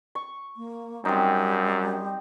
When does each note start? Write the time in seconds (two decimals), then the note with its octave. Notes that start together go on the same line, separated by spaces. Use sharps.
0.15 C#6
0.57 A#3
1.05 F#2 G3 C4 D#4